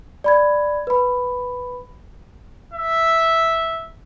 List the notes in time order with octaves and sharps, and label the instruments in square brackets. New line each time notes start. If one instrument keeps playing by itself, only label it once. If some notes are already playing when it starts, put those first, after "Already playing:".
[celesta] D5 B5 G#6
B4 B5
[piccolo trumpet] E5